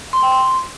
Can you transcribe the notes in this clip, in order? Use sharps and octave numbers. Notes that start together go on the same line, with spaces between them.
C6
G5
C6